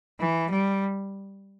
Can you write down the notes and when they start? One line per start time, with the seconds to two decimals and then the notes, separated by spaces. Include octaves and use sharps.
0.20 E3
0.50 G3